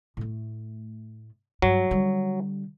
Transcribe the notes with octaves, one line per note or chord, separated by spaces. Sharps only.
A2 A3
G2 F#3
D3 G3